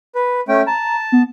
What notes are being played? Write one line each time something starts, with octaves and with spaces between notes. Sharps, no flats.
B4
A3 C#4 G5
A5 A#5
B3